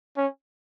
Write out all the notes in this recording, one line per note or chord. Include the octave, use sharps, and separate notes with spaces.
C#4